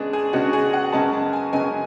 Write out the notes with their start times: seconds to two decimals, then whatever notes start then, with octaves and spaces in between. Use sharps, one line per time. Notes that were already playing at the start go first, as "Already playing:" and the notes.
Already playing: C#3 G#3 B3 D4 G#4
0.13 G#4
0.33 C#3 G#3 B3 D4 F#4
0.53 G#4
0.73 F#5
0.92 F#2 C#3 G#3 B3 A5
1.13 A5
1.33 G#5
1.52 F#2 C#3 G#3 B3 G#5